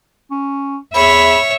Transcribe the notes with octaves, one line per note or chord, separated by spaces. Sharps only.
C#4
E2 C#5 E5 B5